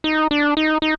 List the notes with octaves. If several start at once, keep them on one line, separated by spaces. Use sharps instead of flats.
D#4
D4
D#4
D#4